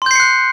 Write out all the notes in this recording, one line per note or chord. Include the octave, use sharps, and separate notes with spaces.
C6 F#6 G6 C7 C#7